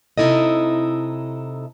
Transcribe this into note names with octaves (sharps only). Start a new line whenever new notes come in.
C3 D#4 E4 A4 D#5